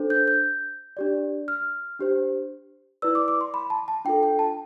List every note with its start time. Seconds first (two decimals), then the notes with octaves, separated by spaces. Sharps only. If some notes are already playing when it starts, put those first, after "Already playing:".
Already playing: D4 A4 C5
0.10 G6
0.28 G6
0.97 D4 G4 D5
1.48 F6
1.99 D4 G4 C5
3.02 E4 B4 D5 E6
3.15 D6
3.28 D6
3.41 C6
3.54 B5
3.70 A5
3.88 A5
4.05 D4 F4 A4 G5
4.23 G5
4.39 A5